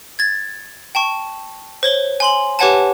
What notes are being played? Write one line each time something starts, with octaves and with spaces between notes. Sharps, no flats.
G#6 A6
G5 A5 C#6
C5 C#5 G7
G#5 C6 F#7
G4 B4 C#5 F#5 G#5 A5